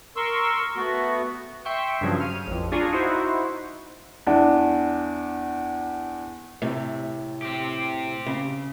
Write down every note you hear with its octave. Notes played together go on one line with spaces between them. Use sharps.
A#4 C6 C#6 E6
A3 B3 F#4
E5 G5 C6 C#6
G2 C#3 F3 F#3
F6 D#7
A1 F2
D4 F4 G#4 G#5 A#5 C#6
D#4 E4 F#4 C5
E2 D4
A2 C3
C4 G4
C#3